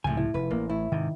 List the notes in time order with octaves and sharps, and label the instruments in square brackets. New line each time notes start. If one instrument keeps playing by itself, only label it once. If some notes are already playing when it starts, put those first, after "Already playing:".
[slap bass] C#2 C3 F3 [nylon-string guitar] A2 G3 [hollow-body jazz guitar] G#5
[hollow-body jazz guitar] E4
[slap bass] F1 [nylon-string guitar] B4
[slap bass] A1 [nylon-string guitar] A#3
[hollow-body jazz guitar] A2 [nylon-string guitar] E4
[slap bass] G#2 C3 [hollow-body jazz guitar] D#3